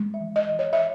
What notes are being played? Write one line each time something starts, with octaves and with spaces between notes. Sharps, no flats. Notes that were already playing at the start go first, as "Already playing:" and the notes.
Already playing: G#3
E5
E3
D#5
E3
C#5
E5